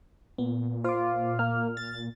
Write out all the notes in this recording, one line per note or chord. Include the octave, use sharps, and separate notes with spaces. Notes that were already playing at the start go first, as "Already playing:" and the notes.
A#2 B3
F4 C5 D6
A#3 F6
A6